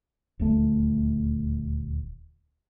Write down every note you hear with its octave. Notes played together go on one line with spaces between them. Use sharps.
D#1 D2 A3